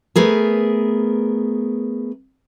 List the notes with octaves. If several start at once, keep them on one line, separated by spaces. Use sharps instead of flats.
A3 B3 G#4 A#4